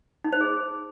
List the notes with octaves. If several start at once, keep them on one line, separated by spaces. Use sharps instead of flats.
D#4
C5
G#4